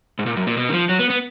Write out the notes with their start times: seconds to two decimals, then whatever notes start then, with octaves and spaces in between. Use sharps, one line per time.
0.19 G#2
0.26 A#2
0.37 F#2
0.47 A#2
0.57 B2
0.69 D#3
0.73 F3
0.89 F#3
0.99 B3
1.10 B3